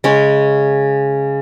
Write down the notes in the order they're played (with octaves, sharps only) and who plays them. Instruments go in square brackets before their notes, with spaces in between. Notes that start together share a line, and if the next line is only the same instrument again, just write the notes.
[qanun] C#3 G#3 C#4